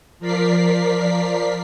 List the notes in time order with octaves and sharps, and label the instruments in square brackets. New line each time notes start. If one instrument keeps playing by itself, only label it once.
[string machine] F3 A#4 D5 B6 C7